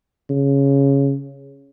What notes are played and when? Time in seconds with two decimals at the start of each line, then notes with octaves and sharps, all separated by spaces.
0.30 C#3